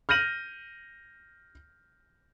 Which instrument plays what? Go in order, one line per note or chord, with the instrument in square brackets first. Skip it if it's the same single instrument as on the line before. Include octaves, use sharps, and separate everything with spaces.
[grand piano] F6 G6 A#6 D#7 F#7